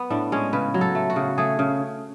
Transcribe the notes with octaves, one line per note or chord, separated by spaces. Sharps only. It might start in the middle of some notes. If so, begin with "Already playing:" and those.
Already playing: B3
A2 D4
G#3 C#4
C#3 B4
F#3
A4
A3
F#4
C#3
A3 G#4
C#3